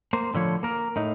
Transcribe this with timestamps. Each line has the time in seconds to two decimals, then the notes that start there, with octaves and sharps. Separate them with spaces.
0.13 A#3 C5
0.34 A2 D3 F3 C#5
0.63 A#3 A#4
0.96 A2 D#4